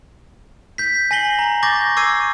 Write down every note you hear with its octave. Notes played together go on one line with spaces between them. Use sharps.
G6 B6
G#5 A#6 C7 F#7 G7
A#5
C#6 D6 G6 A6 A#6
C#6 D6 E6 G#6 C7 D#7